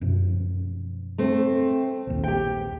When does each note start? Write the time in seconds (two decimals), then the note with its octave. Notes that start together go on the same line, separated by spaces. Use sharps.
0.01 F#2 B2 F3
1.18 A3 C4
2.07 A#1 D#2
2.24 G4 G5